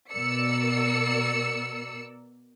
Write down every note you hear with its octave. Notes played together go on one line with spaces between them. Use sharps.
B2 A#4 D5 E6 C#7